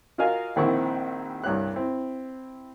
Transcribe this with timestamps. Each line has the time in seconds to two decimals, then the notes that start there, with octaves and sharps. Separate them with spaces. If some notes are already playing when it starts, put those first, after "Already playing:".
0.18 F4 F#4 A#4 D#5 F5 G#5
0.56 A#1 D#3 C4 E4 F#5 C#6
1.44 C2 G2 G4 C#5 F#6
1.74 C4 E4